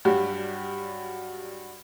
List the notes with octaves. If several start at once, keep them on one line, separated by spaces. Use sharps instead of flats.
G2 F#3 G3 F#4 G4